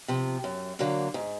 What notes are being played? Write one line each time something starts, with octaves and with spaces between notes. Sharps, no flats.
C3 F3
F#2
D3 F#3 A#3
G#2